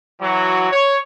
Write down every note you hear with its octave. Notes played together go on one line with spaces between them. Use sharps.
E3 F#3 F#4
C#5